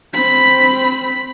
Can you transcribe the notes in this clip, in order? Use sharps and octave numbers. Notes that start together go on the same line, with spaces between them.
C4 B5 B6